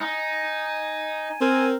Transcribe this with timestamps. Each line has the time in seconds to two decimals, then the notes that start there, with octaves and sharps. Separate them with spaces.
0.01 D#4 G#5
1.41 C4 A#4 G#5